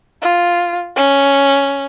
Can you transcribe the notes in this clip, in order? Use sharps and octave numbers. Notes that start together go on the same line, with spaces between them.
F4
C#4